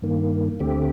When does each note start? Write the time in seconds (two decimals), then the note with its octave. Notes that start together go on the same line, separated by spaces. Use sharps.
0.02 G2 D#3 A#3
0.59 D2 D3 A3 C4 G4